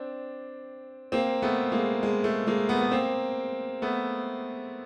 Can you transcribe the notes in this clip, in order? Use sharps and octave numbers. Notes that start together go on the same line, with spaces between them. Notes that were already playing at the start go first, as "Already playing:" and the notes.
Already playing: C4 D4
A#3 C4
A3 B3
G#3 A#3
G#3
A3
G#3 A#3
A3 B3
B3
A#3 C4
A3 B3